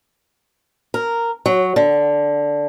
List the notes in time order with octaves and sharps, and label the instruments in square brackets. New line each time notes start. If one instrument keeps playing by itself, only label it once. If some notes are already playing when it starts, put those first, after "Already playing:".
[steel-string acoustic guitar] A#4
F#3
D3